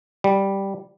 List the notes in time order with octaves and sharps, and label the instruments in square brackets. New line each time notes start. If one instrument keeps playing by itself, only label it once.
[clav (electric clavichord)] G3